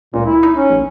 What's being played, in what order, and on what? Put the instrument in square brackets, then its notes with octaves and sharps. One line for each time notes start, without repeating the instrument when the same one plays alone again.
[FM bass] C#2 [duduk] A#2
[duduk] E4
[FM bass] D#4
[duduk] C#4
[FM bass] A#1